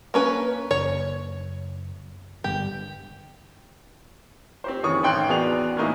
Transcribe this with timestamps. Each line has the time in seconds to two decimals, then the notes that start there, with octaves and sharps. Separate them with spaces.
0.14 A#3 C#4 B4
0.71 F#1 C#5
2.44 G1 G4
4.64 C4 G4 C5
4.83 F#1 D#3 E3 C#5 C#6 D#6
5.03 A1 D#3 G5 C6 F#6
5.28 E2 B3 F#4 G#4 D5 F7
5.77 A2 E3 A#3 D#4 E4